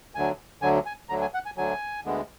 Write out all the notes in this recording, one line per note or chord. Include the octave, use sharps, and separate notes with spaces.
D2 D3 F#3 G#5
D2 D3 F#3 G#5
G#5
D2 D3 F#3 A#5
G#5
F#5
G#5
D2 D3 F#3 G#5
D2 D3 G#3 B3